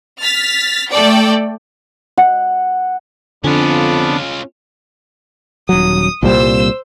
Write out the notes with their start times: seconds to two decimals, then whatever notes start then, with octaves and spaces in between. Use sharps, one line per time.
0.21 F6 A6 B6
0.90 A3 A4 D5 G5
2.18 F#5
3.44 F2 D3 B3 C#4 D4 F4
5.69 D#1 F#3 D#6
6.23 C2 A#2 G3 C5 E6